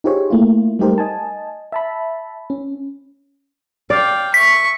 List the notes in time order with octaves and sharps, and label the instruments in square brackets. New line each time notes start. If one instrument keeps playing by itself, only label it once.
[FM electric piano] D#4 F4 G4 G#4 C5 C#5
A3 A#3 E4 F4
G3 A3 D#4 G4 A#4 C5
D#5 G#5 A5
E5 A5 B5
C#4
[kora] D5 [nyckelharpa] F5 G5
[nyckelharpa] E5 C#6 [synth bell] B6